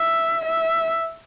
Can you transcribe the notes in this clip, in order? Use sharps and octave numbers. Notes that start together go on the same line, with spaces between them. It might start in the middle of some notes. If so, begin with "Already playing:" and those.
Already playing: E5
E5